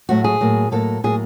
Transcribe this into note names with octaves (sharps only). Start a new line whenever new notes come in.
A2 F#3 A3 F#4
G#4
A2 F#3 A#3
A2 F#3 A#3 A4
A2 F#3 A#3 G#4